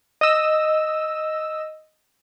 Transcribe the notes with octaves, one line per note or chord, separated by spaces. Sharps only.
D#5 E6